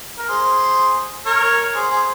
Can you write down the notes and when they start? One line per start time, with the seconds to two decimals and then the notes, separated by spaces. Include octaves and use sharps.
0.18 A#4
0.28 G#4 C5
1.26 A#4 C#5
1.75 G#4 C5
1.91 G#4 C5